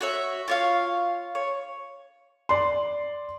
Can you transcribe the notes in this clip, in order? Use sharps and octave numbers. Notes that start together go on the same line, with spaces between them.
F#4 C#5 E5
F4 C#5 F5
C#5
D5 C6